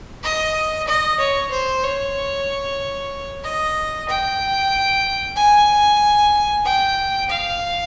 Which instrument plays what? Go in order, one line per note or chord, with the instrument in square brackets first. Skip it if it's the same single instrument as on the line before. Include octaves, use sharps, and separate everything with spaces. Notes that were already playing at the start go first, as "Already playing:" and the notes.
[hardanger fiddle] D#5
D#5
C#5
C5
C#5
D#5
G5
G#5
G5
F5